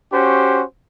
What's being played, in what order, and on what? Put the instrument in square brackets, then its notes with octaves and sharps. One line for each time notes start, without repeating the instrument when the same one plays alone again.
[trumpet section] C#4 F#4 G4 C5